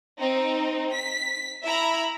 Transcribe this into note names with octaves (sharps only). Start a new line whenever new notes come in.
C4 D#4
B6
E4 E5 A#5 B5